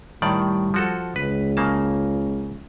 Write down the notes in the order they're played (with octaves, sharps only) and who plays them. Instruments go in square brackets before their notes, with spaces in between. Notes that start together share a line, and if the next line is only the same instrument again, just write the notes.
[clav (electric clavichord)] A2 D#3 D5 [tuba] G3
[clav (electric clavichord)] F3 F#4 A4
[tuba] C#2 [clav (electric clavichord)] B4
[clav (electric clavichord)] C#3 A#3 A5